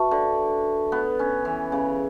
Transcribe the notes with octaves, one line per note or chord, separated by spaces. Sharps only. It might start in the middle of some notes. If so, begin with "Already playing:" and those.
Already playing: F#4 B4 E5 A5 C#6
D3
B3
C#4
E3
C#3